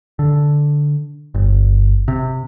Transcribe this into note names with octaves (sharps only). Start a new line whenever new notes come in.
D3
G1
C3